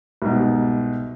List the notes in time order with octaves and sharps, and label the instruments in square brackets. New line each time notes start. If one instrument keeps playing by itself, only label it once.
[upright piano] C2 G#2 B2